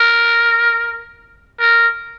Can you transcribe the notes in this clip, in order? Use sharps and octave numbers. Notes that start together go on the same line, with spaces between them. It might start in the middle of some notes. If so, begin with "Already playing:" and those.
Already playing: A#4
A#4